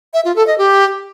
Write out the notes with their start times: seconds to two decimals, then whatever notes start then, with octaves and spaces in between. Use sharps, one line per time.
0.14 E5
0.25 F4
0.36 A4
0.47 D#5
0.58 G4